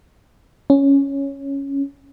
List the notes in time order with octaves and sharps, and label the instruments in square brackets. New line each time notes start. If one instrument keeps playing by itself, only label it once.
[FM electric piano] C#4